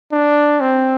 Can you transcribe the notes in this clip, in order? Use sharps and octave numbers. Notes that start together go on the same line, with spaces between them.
D4
C4